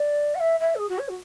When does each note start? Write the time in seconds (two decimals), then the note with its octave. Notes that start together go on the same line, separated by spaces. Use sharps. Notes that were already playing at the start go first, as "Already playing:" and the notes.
Already playing: D5
0.35 F#5
0.40 E5
0.60 E5
0.75 A4
0.79 G#4
0.89 F#4
0.99 C#5
1.08 F#4